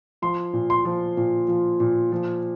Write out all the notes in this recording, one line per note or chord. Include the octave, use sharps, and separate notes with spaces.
F3 C6
A#2
C6
F3
A#2
F3
A#2
F3